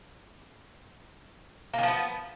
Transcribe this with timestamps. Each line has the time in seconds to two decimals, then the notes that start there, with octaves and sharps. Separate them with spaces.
1.74 A#3
1.78 D#3
1.83 F3
1.88 B3